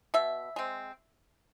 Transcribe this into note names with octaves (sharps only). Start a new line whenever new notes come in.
B2 E5
G#3 C4